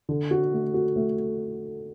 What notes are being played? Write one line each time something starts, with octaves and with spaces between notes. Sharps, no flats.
D3
F#4
A3
F#4
A3